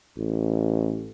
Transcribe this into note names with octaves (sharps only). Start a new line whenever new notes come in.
A1